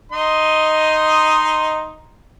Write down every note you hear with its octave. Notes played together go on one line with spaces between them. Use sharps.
D#4 D#5 C6